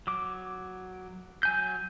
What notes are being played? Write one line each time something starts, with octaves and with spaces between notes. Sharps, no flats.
F#3 D6
F#3 G#5 G6